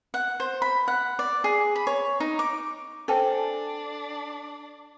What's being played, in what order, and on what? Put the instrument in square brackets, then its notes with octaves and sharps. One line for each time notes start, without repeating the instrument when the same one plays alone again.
[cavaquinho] F#5
C5
B5
F#5
D5
G#4
B5
C#5
D#4
D6
[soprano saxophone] D4 [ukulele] A4 [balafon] C5 G5 G#5